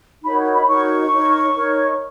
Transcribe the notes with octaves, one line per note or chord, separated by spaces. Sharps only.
D#4 F#4 A#4 C#5 B5
B5
D#4 F#4 A#4 C#5 C#6
D#4 A#4 C#5
D#4 A#4 C#5